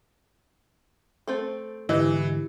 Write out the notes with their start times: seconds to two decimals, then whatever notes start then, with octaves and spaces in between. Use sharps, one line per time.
1.28 A3 C4 A4
1.89 G#2 D3 E3 E4 F#4 G4 D#5